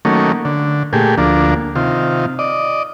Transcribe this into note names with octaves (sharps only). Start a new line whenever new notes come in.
D#3 F#3 A3 A#3 C#4
D3
A#2 A3 G4 G#4
D2 F3 A#3 D4
C3 D#3 F4
D5 D#5